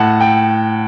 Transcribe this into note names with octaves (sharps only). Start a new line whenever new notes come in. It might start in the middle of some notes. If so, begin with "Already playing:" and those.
Already playing: A2 F#5 A5
G5